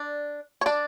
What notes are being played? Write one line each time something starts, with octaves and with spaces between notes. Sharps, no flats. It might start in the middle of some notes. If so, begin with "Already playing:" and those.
Already playing: D4 D5
C#5
D4 D5